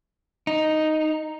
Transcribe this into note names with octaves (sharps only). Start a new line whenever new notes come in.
D#4